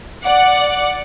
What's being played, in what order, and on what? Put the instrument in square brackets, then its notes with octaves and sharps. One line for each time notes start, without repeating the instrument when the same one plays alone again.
[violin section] D5 F#5